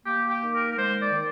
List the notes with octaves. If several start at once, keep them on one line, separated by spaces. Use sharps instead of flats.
A#3 G4
G4
D#3
A#4
A#4
G#3 C5
D5
D#3